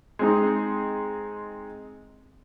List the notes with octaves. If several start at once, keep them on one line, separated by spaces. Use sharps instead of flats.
G#3 C4 D#4